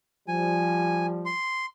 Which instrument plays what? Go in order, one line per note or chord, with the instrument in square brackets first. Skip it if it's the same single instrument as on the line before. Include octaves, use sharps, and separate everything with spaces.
[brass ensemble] F3 G3 [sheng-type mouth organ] G#5
[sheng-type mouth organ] C6